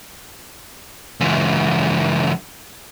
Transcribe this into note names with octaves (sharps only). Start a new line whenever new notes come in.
C#2 E3